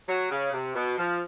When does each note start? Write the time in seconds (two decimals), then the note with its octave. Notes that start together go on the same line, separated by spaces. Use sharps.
0.08 F#3
0.30 C#3
0.53 C3
0.75 B2
0.98 F3